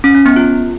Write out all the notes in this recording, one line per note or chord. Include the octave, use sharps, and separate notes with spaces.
C#4
C#4
B3
F4